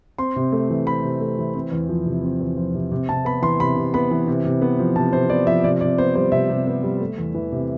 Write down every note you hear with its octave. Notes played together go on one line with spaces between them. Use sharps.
C4 C6
C3
A3
E3
C4 B5
C3
A3
E3
C4
E2
F3
C3
C4
E2
F3
C3
C3
C3 A5
B3 B5
E3 C6
C3 B5
C3
B3 B5
E3
C3
C3
B3
F3
C3 A5
C3 C5
B3 D5
F3 E5
C3 D5
C3 D5
B3 C5
G3 C5
C3 E5
C3
B3
G3
A3
E2
E3
C3